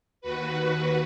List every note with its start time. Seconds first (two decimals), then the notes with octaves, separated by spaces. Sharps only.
0.21 D#2 F#4 B4